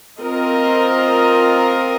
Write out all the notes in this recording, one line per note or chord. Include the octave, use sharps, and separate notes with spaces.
C4 F4 A#4 D#5